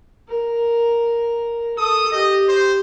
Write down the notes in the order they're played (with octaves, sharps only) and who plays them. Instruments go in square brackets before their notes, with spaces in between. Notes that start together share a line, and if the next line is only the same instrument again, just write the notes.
[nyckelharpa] A#4
[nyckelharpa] A4 [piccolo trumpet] D#6
[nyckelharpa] G4 [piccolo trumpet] D#5
[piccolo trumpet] C5